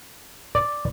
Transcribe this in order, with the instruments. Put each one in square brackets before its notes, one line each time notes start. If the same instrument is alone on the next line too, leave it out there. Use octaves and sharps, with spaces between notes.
[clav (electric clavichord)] D5